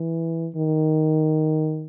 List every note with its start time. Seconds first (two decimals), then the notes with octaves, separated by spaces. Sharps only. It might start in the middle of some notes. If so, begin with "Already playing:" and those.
Already playing: E3
0.56 D#3